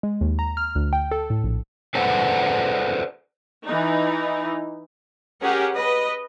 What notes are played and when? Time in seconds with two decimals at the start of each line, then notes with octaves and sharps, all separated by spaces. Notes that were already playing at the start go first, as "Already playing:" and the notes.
0.03 G#3
0.21 D#2
0.39 A#5
0.57 F6
0.75 D2
0.93 G5
1.11 A4
1.30 A2
1.44 A#1
1.95 G#4 A4 B4 C5 D5 F#5
3.65 E3 D#4
5.41 C#4 G4 G#4 A#4 F#5
5.73 B4 D#5